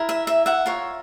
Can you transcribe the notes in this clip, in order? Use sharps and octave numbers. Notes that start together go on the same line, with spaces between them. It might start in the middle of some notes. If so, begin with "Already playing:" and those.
Already playing: E4 A#4
E5
E5
E5 F#5
F4 A#4 C#5